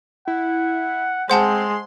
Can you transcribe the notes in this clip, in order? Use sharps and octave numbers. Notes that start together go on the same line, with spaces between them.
E4 F#5
G#3 C4 C5 F#5 A5 C6